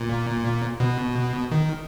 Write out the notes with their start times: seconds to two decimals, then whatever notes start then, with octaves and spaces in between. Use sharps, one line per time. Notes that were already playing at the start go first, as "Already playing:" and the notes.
Already playing: A#2
0.80 B2
1.52 D#3